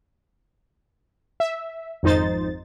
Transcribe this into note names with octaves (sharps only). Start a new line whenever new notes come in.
E5
G#1 F2 D#4 C5 A6